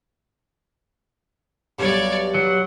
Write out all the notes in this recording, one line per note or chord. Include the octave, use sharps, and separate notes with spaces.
B1 G2 C#5 D5
F#3 F#5